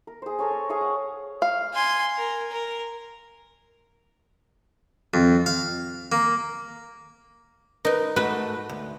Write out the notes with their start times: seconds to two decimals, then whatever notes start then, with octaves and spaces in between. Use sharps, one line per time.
0.07 A#4
0.22 G#4 C5
0.39 A4 A#4 C#5 G#5
0.51 C#5
0.69 G#4 F5 G#5 C#6
0.81 F#5
1.42 F5
1.74 G#5 C6
2.18 A#4
2.52 A#4
5.14 F2
5.46 F5
6.12 A#3
7.85 D#4 A#4 B4
8.16 G#2 A3 F#4 B4
8.69 D2